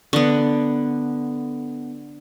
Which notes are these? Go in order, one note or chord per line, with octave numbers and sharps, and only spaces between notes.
D3 B3